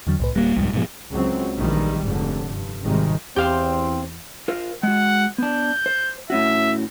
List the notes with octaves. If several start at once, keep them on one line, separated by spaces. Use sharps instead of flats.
E2 D3 F#3
C2 A2 B4
D1 G3 A#3
C2 F2 G#2
G#2 B2 F3
C#2 C#3 F#3 C4
A#1 D#3 E3 G3
F1 G#2 D3
G2
G#1 C3 D#3 G3 G#3
E2 C4 G4 C5 F5 G5
F4 A#4 C5
G#3 F#4 F#5
B3 D4 G6
C5
A2 C#4 F#4 E5